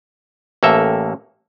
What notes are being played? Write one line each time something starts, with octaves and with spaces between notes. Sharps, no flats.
A1 A#3 A4 E5